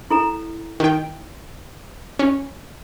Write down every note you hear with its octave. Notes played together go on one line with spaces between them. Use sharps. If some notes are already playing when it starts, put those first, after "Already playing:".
E4 A4 A#5
D#3 G5
C#4